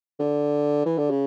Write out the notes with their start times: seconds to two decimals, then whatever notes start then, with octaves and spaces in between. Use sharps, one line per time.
0.19 D3
0.86 E3
0.98 D3
1.10 C#3